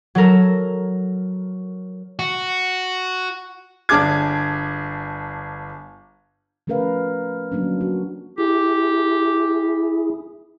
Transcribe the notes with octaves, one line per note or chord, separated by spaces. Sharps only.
F#3 A4 A#4
F#4
G1 D4 G#4 D6 G#6
F3 A3 C#4 A#4 B4 F5
F#3 A#3 C#4 D4
F#4
E4 G4 G#4